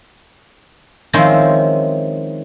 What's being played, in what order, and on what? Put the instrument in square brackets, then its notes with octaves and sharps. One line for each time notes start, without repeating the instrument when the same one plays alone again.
[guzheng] D#3 F3 G#3 C4 C#4 E4